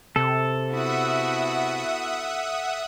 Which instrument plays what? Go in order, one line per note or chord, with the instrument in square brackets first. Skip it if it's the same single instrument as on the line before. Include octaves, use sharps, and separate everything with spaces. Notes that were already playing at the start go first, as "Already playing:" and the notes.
[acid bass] C3 [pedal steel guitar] A4
[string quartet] B3 E4 F#4 [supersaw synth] E5 F#5 D#6